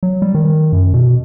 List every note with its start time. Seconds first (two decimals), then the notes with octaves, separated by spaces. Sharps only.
0.03 F#3
0.22 G3
0.35 D#3
0.73 F#2
0.94 B2